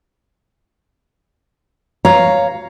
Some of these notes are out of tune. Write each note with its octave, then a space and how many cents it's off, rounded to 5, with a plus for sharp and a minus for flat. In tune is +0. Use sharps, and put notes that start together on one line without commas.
C#5 +0 F5 +0 A#5 +0